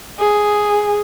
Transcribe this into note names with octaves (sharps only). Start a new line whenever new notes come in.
G#4